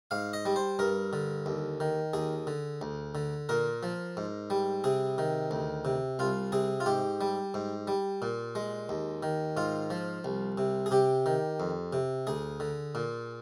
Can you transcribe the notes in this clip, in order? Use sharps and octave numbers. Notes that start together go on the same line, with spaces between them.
G#2 F5
D#5
G3
C5
G2 A#4
D3
D#2
D#3
D#2 G#4
D3
D2
D3
A#2 A#4
F3
G#2
G3
C3 G#4
D#3
D2
C3
C2 F4
C3 G#4
F4
G#2 G4
G3
G#2
G3
A#2
G#3
D#2
D#3
G#2 F4
F3
C2
C3
G#4
C3 G4
D#3
F2
C3
D2 G#4
D3
A#2